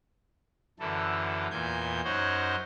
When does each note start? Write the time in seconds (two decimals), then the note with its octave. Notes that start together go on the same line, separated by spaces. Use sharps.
0.79 F#2 D3 E3 A4
1.51 E2 A#2 G#5 G6
2.04 F#2 D#4 C5 C#5 F#5